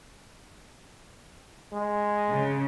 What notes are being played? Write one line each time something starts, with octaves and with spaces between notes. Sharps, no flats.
G#3
C#3